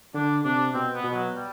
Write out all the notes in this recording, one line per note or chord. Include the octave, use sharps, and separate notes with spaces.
D3 D4
C3 D4
B2 C4
B3
B2
F#3
G3